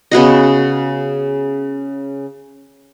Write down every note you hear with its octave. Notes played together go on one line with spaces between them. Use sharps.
C#3 B3 F#4 D#5